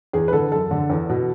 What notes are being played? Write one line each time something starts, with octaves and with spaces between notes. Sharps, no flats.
E2 G#4
B4
D3 A4
F#2 A4
D3
E2
B2